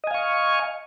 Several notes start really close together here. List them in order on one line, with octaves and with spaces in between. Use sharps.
D#5 G#5 F5 C#6